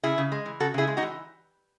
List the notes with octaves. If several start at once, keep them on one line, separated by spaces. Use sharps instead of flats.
C#3 E4 G#4
C#3
G#3
E3
C#3 F#4 A4
C#3 E4 G#4
G#3
D#4 F#4
E3